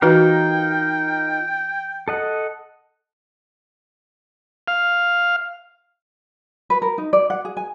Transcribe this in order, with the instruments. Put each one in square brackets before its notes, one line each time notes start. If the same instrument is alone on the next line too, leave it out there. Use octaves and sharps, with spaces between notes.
[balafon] E3 F#4 B4 [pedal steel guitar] D#4 F4 A#4 [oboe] G5
[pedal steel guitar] A4 D#5 F#5
[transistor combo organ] F5
[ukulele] B4
A#4
D#4
D5
F#5
G#4
G#5